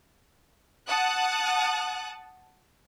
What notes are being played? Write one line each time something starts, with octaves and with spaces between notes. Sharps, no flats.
F#5 A5 D#6 F#6